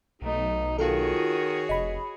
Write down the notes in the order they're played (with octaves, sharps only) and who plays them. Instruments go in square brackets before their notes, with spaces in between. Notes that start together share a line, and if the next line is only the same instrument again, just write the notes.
[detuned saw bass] B1 [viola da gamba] A3 [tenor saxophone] D#4
[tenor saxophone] D#3 [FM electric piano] F4 A4 [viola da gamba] F#4 G#4 C#5
[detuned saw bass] F1 [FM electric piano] D#5 B5